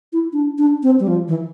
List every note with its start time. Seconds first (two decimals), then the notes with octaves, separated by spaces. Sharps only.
0.13 E4
0.33 D4
0.58 D4
0.83 C4
1.00 G3
1.08 F3
1.28 E3